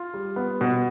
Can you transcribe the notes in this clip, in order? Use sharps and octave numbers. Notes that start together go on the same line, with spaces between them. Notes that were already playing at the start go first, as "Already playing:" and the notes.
Already playing: F4
G3
B3
B2